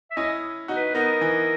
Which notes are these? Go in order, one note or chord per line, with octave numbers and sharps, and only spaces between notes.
E5
C#4 E4 D#5
D#4 F#4
B4
B3 D#4 A#4
E3